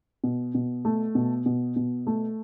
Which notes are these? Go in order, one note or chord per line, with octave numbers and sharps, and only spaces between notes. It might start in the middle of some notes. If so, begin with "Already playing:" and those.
B2
B2
A3
B2
B2
B2
A3